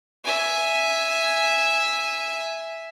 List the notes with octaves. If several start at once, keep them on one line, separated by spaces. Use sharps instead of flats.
E5 G#5